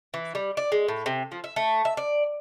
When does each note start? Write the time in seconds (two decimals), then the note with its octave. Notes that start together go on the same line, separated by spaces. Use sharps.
0.14 E3
0.35 G3
0.57 D5
0.72 G#3
0.88 A2
1.06 C3
1.32 F3
1.44 E5
1.56 A3
1.85 E5
1.97 D5